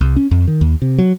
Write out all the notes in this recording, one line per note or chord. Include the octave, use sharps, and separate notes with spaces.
C2
C#4
F2
D#3
D#2
C3
F#3